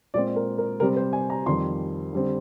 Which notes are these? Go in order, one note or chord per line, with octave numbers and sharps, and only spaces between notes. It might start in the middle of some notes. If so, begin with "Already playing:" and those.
A#2 G#3 C4 D5
A#4
A#4
C3 G3 C4 A#4
C5
G#5
A#5
F2 D#3 G3 C6
D3 G3 C4